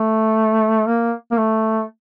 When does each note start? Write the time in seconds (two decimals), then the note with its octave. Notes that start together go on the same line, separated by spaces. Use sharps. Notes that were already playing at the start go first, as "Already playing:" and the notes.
Already playing: A3
0.87 A#3
1.31 A#3
1.38 A3